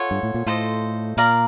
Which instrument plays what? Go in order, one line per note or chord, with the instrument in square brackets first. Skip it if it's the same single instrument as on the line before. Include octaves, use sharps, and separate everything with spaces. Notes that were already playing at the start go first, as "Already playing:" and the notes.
Already playing: [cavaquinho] F4 A4 C#5 F#5
[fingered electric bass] G2
A2
A#2
[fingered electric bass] A2 [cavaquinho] F4 A4 C5 D#5
[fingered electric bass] A#2 [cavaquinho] A#4 D5 F5 A#5